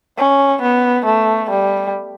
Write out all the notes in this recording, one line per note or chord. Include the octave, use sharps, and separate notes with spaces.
C#4
B3
A3
G3